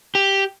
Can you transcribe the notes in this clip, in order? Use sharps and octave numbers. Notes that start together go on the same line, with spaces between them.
G4